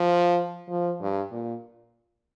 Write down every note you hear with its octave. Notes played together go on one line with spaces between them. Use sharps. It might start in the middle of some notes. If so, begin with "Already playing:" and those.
Already playing: F3
F3
G2
A#2